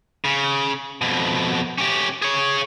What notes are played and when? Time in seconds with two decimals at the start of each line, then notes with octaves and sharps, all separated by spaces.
0.25 C#3
1.01 F2 B2
1.78 C#4 G4
2.22 G#4 C#5